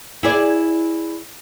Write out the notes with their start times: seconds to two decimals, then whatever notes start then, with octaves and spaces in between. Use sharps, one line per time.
0.23 E4 G#4 D5